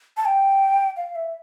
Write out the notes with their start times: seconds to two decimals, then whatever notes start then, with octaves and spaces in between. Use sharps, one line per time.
0.17 A5
0.25 G5
0.97 F5
1.15 E5